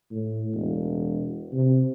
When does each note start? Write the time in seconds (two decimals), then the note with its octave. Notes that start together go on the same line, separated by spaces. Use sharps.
0.11 A2
0.54 E1
1.53 C3